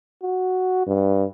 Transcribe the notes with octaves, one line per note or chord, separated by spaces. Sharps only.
F#4
G2